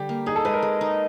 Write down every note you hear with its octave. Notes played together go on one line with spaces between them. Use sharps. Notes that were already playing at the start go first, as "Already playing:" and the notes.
Already playing: D3 G3 G4
A#3
D#4 G#4
A4
G#3 B4
A#4
G#3
D#4